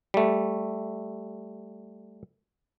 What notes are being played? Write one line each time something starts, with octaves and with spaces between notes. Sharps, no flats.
G3 A3